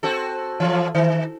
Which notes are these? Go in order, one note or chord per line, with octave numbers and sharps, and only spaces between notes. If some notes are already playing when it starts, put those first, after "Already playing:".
C4 F#4 A4
E3 F3
D#3